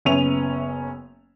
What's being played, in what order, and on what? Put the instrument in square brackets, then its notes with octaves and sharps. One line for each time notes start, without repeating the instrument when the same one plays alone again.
[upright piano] F#1 B3 C#4 E5 D#7 F7